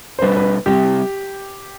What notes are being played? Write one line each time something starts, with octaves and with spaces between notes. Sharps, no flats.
C5
B2 G3 D4 B4
B4
C3 G3 C4 G4